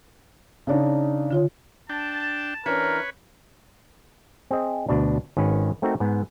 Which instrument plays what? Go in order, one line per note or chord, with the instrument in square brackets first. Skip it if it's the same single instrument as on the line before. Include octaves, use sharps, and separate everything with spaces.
[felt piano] C#3 D4 D#4
[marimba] D3 F4 C#5
[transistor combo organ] D4 G5 [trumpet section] A5
[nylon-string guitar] E3 C#4 D4 [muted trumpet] A#4 [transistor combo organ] B4 C#5
[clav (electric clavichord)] C4 G#4 D#5
D2 B2 D4
G#1 D#3 C#4 B4
A3 C4 D#4 F#4 A#4
G#2 B3